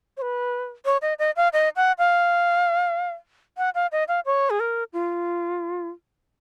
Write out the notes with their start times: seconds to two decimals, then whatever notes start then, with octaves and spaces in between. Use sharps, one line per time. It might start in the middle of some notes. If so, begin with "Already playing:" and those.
0.17 C#5
0.22 B4
0.85 C#5
1.02 D#5
1.19 D#5
1.37 F5
1.53 D#5
1.76 F#5
1.98 F5
3.58 F#5
3.75 F5
3.92 D#5
4.08 F5
4.26 C#5
4.50 G#4
4.60 A#4
4.93 F4